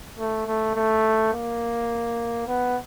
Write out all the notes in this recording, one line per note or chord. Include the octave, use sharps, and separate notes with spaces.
A3
A3
A3
A#3
B3